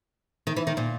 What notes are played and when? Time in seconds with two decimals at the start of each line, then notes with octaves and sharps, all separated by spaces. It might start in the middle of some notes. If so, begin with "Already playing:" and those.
0.47 D#3
0.56 E3
0.67 D#3
0.77 A#2